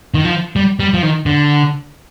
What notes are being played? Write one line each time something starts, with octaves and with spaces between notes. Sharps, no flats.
D#3
F3
G3
G3
F3
D#3
D3